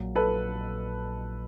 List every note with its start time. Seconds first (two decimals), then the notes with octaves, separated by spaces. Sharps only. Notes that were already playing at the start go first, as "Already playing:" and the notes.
Already playing: A#1 A#2 F#3
0.15 A4 B4